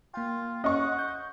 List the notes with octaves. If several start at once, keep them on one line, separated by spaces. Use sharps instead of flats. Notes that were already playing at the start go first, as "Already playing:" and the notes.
A#3 F4 G5
C#4 D#5 F#5 C#6
G6